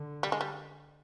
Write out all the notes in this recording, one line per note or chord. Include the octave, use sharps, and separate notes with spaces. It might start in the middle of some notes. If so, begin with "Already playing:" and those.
Already playing: D3
G3
G#3
G3